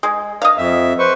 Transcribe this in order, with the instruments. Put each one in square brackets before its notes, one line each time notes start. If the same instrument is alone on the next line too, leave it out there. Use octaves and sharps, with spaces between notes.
[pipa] G#3
D#5 F5
[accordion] F2 E5
B4 C5 C#6